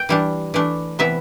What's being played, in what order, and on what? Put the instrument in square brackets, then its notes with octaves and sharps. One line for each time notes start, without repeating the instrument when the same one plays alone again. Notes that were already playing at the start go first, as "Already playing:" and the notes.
Already playing: [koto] G5
E3 G3 D4
E3 A3 D4
C3 E3 B3 E5